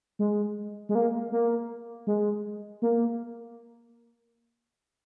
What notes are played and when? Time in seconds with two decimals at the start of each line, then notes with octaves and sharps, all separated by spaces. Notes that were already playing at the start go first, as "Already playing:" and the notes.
0.19 G#3
0.89 G#3
0.95 A#3
1.32 A#3
2.07 G#3
2.82 A#3